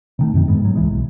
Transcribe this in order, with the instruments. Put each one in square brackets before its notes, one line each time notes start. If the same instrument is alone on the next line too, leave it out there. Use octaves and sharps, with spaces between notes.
[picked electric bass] C3 D#3 A3
F#2 C3 D#3
G#2 G#3 B3
G#2 F#3
C#2 E3 G#3
B1